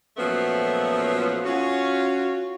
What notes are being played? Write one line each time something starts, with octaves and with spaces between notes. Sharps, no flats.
A#2 F3 F#3 A3 B3 C#4
C#4 F4 F#4